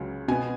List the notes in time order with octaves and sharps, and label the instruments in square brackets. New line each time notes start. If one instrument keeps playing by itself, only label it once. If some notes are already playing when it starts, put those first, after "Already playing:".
Already playing: [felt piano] C#2 C#3 F#3
B2 B3 G#5